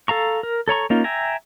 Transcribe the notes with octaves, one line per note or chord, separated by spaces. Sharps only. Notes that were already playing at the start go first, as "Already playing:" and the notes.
A4 F5 A#5 C#6
A#4
A4 C#5 A#5 C#6
A#3 C#4 D#4 F4
E5 G5 G#5 A#5